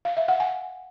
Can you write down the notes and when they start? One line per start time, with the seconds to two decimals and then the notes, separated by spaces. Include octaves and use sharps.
0.05 F5
0.17 E5
0.28 F#5
0.40 G#5